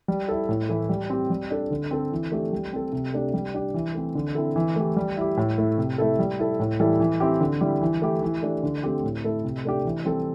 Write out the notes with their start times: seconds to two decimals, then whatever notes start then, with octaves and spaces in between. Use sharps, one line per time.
0.08 G3
0.29 E4 A4
0.49 A2
0.69 E3 A3 E4
0.89 G3
1.10 C4 G4
1.30 G3
1.51 D4 A4
1.71 D3
1.91 C4 A4
2.12 E3
2.32 A3 D4 G4
2.53 G3
2.73 C4 A4
2.93 C3
3.14 A3 D4 G4
3.34 G3
3.54 D4 G4
3.74 E3
3.95 A3 C4
4.15 D3
4.35 C4 E4 A4
4.56 E3
4.76 A3 E4 G4
4.96 G3
5.17 E4 G4
5.37 A2
5.58 A3 E4
5.78 C3
5.98 A3 E4 A4
6.19 G3
6.39 E4 A4
6.60 A2
6.80 E3 G3 E4 A4
7.00 E3
7.20 C4 E4 G4
7.41 D3
7.61 G3 E4 G4
7.81 E3
8.02 A3 E4 G4
8.23 E3
8.43 A3 D4 G4
8.63 D3
8.83 A3 C4 G4
9.04 A2
9.24 A3 E4 A4
9.44 C3
9.65 A3 D4 G4
9.85 E3
10.05 G3 C4 A4